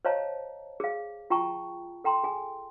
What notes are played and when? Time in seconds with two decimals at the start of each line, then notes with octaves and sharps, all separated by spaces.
0.05 C5 C#5 D#5 F5 A5 A#5
0.80 G#4 F5
1.30 F4 G5 A5 A#5 C#6
2.04 A4 G5 A#5 C6
2.24 G#4 G#5